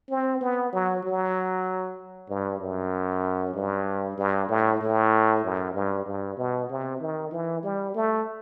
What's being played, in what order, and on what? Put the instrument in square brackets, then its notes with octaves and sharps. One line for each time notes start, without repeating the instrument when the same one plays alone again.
[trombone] C4
B3
F#3
F#3
G2
F#2
G2
G2
A2
A2
F#2
G2
G2
B2
C3
D#3
E3
G3
A3